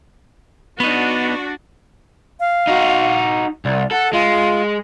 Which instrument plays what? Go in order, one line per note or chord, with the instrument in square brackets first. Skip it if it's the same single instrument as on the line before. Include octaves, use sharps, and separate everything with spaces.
[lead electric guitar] B3 D#4 [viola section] D4 F#4
[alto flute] F5
[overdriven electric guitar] D#4 F#4
[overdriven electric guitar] C2 [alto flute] D5
[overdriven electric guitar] A4 [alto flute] F#5
[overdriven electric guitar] G#3 [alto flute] F4